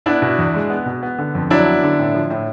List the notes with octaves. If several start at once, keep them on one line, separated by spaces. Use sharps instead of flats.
B3 D4 E4
B2
E2
G#3
B3
B2
B3
D3
F2
F#3 D4 E4
B3
D3
A2
F3
A2